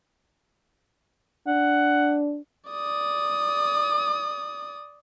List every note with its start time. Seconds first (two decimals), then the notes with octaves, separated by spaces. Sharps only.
1.47 D4 F#5
2.70 D5 D#6